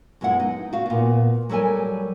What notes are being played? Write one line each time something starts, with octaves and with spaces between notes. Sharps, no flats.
F#2 G#3 B3 E4 F#5
D#4
F#4 F5
A#2 B3
F#3 G3 A4 A#4 G#5